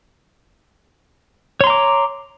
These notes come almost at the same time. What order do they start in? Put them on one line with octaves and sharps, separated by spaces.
C#5 C6 A#5 D6